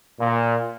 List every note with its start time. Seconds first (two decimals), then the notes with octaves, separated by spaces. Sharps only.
0.20 A#2